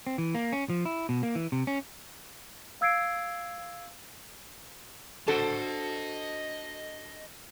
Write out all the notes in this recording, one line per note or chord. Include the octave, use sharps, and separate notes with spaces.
C4
E3
A#3
C#4
F3
E4
B2
A#3
E3
C3
C#4
F5 E6 G#6 C7 D7
D4 F#4 A4 C5 D#5 A5